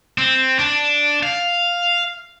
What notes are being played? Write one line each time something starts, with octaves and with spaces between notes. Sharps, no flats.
C4
D4
F5